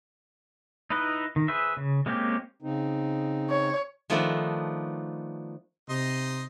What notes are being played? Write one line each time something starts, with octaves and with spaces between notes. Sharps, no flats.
D#4 E4 B4 D#5
D#3
G#4 B4 C5 E5
C#3
G#3 A#3 C4 C#4 G4
C#3 C4 D#4
C#5
D#3 F3 A3 B3 D4 D#4
C3 D#4 D#5 C6